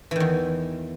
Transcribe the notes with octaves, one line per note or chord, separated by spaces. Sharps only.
E2 D#3 E3